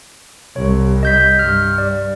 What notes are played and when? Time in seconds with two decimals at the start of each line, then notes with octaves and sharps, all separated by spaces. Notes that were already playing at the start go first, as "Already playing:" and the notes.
0.56 C2 C#5
1.03 D#5 G6 B6
1.39 G2 F6
1.78 D5